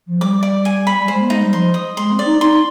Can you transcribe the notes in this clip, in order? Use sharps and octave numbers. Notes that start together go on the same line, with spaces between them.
F3
G3 D6
D5
G#5
B5
G3
G#3 C5
B3
G#3 D#4
G3
F3 C6
D#6
G#3 C6
C4
D5
D#4
D#4 C6